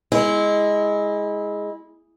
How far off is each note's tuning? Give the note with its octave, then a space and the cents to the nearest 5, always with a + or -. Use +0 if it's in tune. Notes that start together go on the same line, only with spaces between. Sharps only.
G#3 +0 E4 -20